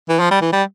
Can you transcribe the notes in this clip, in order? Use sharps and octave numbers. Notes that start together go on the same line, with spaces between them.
E3
F3
G3
E3
G3